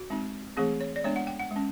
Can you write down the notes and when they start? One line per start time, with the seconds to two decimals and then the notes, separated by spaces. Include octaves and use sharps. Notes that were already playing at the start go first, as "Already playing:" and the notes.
Already playing: F#4
0.10 G#3 C4 D#4
0.57 E3 A3 C4 G#4
0.81 C#5
0.96 D5
1.04 G#3 B3 D4 C#5
1.16 F#5
1.27 G5
1.40 F#5
1.51 G#3
1.56 C#4